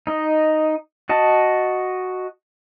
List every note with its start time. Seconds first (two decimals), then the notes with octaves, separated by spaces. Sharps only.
0.07 D#4 D#5
1.09 F#4 D#5 A5